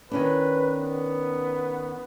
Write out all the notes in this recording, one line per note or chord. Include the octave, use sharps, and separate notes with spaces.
D#3 C#4 D4 B4
B3